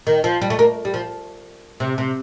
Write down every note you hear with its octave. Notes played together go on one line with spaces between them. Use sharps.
D#3
F3
G3
A3
A#3
G3
F3
C3
C3